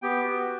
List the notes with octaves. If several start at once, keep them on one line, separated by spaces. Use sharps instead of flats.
B3 G4 G5
F#4